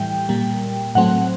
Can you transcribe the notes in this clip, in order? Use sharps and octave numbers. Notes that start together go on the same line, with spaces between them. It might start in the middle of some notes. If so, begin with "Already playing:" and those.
Already playing: A2 E3 G3 G5
A#2 G3 A#3
A2 F#3 A3 C4 F#5